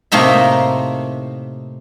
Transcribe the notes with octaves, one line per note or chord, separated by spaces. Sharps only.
A2 C3 A3 A#3 D#4 E5